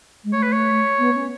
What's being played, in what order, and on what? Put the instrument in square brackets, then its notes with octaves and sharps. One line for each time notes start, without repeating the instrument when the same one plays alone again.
[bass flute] G#3
[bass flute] A3 [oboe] C#5
[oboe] B4
C#5
[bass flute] B3
C#4